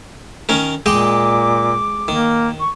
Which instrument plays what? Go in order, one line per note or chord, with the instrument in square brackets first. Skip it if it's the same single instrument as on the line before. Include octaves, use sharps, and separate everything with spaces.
[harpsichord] D#3 C#4 A#4
[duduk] A#2 [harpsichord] G#3 D#5 G5 [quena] D6
[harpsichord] D#3 [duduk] A#3
[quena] C#6